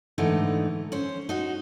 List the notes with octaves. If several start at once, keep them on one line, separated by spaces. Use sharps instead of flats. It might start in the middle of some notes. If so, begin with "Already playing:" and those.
G#2 D3 E3 A3 D#4
C#4 C5
D#4 F#4